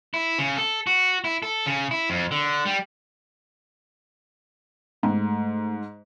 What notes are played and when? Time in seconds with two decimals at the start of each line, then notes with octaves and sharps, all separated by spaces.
0.14 E4
0.39 C#3
0.57 A4
0.87 F#4
1.24 E4
1.43 A4
1.66 C#3
1.91 E4
2.10 F2
2.31 D3
2.65 G3
5.03 G#2 A3